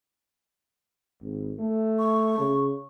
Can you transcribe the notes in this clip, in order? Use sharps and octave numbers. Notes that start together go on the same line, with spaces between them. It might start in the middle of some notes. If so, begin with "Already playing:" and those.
G#1
A3
C#6
C#3